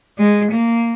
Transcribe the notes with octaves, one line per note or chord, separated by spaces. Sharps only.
G#3
A#3